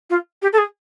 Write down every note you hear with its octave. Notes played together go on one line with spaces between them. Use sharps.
F4
G4
A4
G#4